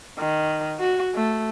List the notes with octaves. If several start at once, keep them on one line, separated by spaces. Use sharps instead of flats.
D#3
F#4
A3